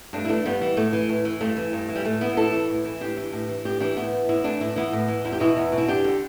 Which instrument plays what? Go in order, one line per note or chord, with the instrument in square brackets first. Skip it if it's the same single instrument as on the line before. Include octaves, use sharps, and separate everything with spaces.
[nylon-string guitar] G2 A3 D4
E4
E3 A3 D4
G2 G3 B3
E3
A2 A3
E3
A2
E3
G2 A3
E3
G2
E3
G3
A2 A3
E3 B3 E4
A2 E4 A4
E3
A2
E3
A2 D4 G4
E3
A2
E3
A2 D4 G4
E3 D4 G4
A2 B3 E4
E3
A2 B3 E4
E3 A3 D4
A2 E4
D4
E3 B3 E4
A2
E3
E2 E4
G4
B2 B3 E4
E2
B2
E4
E2 D4 G4
D3